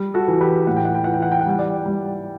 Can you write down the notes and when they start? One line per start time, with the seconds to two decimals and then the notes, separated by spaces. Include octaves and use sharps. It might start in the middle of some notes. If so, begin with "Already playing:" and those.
Already playing: G3
0.14 F#4 A4
0.28 E3
0.41 G4 B4
0.67 A2 F#5
0.77 G5
0.85 F#5
0.95 G5
1.04 E3 F#5
1.14 G5
1.22 F#5
1.32 G5
1.41 F#5
1.46 G3 G5
1.59 D5 F#5
1.86 G3